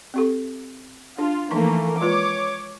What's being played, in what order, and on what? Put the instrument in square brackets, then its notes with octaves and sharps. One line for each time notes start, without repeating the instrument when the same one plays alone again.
[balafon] C4 G4 A4
[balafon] D4 [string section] F4
[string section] E3 A3 A#3 [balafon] F3 D#4 C#6
[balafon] G#3 F4 B4 [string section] C#5 D6